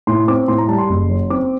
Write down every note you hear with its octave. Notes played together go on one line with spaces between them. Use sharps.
A2 C6
C4 D6
A2 C6
A#5
G3 A5
C6
F#1
F#3
C4 D6